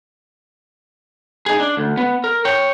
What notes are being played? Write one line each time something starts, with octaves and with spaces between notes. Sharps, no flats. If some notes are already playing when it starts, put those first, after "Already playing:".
D#4 G#4
D4
D2
B3
A#4
C#5 G5